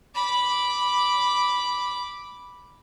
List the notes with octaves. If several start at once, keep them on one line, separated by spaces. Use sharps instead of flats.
B5 D6